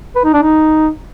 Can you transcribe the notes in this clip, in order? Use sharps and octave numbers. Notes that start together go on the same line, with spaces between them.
B4
D#4
D4
D#4